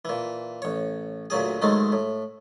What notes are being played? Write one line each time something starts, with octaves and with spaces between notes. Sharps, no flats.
A#2 E3
A1 C#5
D2 A#2 F#3 G#4
G#2 D#3 F#3 G#3 A3
A2